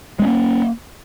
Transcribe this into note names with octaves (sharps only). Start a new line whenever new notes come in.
G#3 A#3 C4 C#4